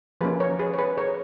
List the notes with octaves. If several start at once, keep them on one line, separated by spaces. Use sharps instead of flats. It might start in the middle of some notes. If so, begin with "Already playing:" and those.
F3 A#3 C#4 G#4 B4
A#4 C#5
G#4 B4
C#5
G#4 B4
A#4 C#5